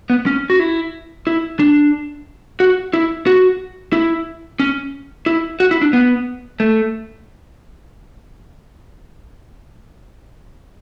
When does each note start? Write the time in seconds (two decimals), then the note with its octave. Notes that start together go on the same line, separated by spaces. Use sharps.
0.10 B3
0.26 C#4
0.50 F#4
0.60 E4
1.27 E4
1.59 D4
2.60 F#4
2.93 E4
3.27 F#4
3.93 E4
4.60 C#4
5.26 E4
5.60 F#4
5.71 E4
5.82 D4
5.93 B3
6.60 A3